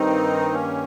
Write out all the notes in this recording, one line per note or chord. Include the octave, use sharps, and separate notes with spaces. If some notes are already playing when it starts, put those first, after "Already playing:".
Already playing: G2 D#3 C4 D#4
A#3 C#4